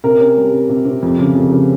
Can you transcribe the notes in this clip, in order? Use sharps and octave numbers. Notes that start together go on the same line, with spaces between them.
C3 A#4
C#4
G3
C3
C3
C3
F2
C#3
F2
C#3